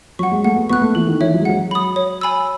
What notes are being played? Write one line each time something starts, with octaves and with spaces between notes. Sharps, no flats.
F#3 F#5 C#6
G#3
A3 F#5
B3
B3 C#6 F#6
A3
E3 A4
D#3
E3 C#5 E5
F#3
G#3
F#3 F#5
B5 D#6
C#5
G#5 B5 E6